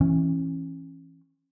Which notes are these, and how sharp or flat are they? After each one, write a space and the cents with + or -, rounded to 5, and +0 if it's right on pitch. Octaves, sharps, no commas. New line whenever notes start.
E3 +0 C#4 -30